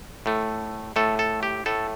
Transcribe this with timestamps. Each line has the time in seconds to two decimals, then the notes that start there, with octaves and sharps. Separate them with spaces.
0.26 A2 A3
0.96 A2 A3 A4
1.19 A4
1.43 G4
1.66 A2 A3 A4